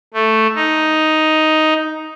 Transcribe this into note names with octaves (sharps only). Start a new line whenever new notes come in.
A3
D#4